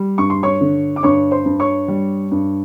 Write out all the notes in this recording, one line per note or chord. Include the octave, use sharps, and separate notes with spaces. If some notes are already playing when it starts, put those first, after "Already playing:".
Already playing: G3
G2 C#6
C6
C#5 C#6
D3
D6
G2 C#5 C#6
C5 C6
G2
C#5 C#6
G3
G2